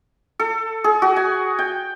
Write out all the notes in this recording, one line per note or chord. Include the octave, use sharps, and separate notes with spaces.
A4
G#4
F#4
G#5
G5